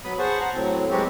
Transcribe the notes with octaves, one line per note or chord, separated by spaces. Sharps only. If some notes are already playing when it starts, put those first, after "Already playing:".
F#3 B3 B5 D#6
G#4 C5 F#5 A5 C#6
F#5 A#5
A2 F#3 C4
F#3 G#3 B3 C4 F#4 G4